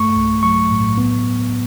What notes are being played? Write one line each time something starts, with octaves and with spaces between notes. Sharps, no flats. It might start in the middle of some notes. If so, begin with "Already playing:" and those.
Already playing: G2 A3 C#6
B1
F#3 C#6
A2
B3